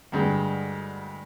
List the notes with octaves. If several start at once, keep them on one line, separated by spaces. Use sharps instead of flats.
D2 G2 G#3